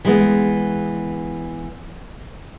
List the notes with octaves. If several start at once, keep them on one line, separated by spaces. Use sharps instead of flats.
E3 G#3 B3